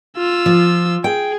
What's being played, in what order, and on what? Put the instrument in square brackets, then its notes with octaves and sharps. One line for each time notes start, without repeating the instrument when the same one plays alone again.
[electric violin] F4 E6
[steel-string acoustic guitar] F3
[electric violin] G#4 [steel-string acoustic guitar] G5